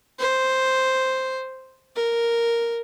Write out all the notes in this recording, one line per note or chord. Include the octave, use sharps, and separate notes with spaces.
C5
A#4